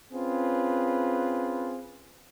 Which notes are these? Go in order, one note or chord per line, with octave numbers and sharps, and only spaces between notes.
C4 C#4 F4 G#4 B4